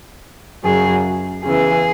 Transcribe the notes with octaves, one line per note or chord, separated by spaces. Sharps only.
F#2 C#3 F#3 G#4
E2 C#3 E3 G#4